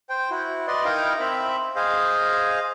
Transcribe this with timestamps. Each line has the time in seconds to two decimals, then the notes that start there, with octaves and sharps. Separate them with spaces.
0.10 C5 G5
0.30 E4 F#4
0.67 B4 D5 D#5 C6
0.85 D#4 E4 A#4 F5 G5 A#5
1.20 C4 E5 B5
1.76 G#4 C5 D#5 F5